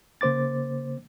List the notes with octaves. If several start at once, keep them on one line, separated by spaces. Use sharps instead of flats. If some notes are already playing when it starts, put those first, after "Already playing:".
C#3 A#3 C5 D6 A6